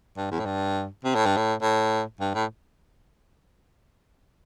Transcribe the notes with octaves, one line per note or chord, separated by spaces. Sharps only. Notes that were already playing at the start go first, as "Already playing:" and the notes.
G2
E2
A2
G2
C3
A2
G2
A2
A2
G2
A2